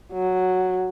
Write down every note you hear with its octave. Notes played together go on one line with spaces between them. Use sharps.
F#3